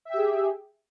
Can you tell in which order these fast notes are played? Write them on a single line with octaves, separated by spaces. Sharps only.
E5 G5 G4 G#4